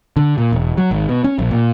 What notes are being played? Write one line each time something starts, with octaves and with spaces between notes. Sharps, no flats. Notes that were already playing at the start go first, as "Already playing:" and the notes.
D3
A#2
E1
F#3
G#1
B2
C#4
A#1
A#2